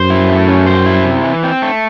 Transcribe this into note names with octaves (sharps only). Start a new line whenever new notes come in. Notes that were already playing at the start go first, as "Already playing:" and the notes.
Already playing: F#2 C5
E4
A3
C#4
C5
E4
C3
E3
C4
A3